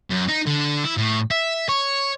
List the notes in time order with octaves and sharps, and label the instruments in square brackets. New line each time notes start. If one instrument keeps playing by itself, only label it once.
[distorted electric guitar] F#2
D#4
D3
E4
A2
E5
C#5